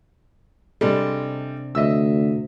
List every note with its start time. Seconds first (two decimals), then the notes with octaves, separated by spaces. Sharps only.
0.81 C3 G3 G#3 D4 A4
1.75 D2 D#5 E5 E6